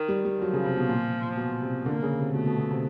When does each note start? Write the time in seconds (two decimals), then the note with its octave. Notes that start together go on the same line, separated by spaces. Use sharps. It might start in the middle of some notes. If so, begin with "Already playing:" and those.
Already playing: D#3
0.08 G3
0.25 G3
0.41 F3 F#3
0.53 C#3
0.65 C3
0.77 B2
0.89 A#2
1.37 B2
1.62 C3
1.86 D3 A#3
2.03 C#3
2.18 C3
2.34 B2 A3
2.46 B2
2.58 B2
2.70 C3